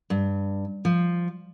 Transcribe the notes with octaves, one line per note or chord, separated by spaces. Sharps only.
G2
F3